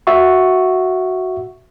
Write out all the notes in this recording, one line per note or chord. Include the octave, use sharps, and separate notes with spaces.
F#4 E5 F#5 C#6